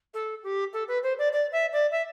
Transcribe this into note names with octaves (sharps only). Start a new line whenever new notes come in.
A4
G4
A4
B4
C5
D5
D5
E5
D5
E5